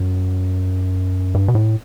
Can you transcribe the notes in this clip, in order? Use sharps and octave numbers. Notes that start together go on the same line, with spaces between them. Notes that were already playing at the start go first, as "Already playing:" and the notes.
Already playing: F#2
G2
B2
A2